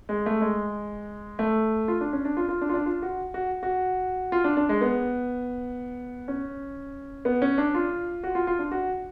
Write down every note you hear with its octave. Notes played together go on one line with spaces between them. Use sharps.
G#3
A3
G#3
A3
F4
D4
C#4
D4
F4
F4
D4
F4
D4
F4
F#4
F#4
F#4
F4
D4
D4
G#3
B3
C#4
B3
C#4
D4
F4
F#4
F4
F4
D4
F#4